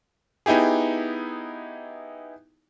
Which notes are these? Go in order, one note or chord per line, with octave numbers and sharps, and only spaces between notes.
B3 D#4 E4 G4 G#4